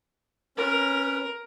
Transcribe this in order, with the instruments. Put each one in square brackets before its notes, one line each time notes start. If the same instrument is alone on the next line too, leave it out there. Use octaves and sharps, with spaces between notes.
[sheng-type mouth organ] C#4 B4 [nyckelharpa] A#4